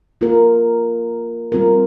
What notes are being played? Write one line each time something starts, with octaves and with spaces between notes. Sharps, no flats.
A#3 F4 A#4
G3 C4 F4 A#4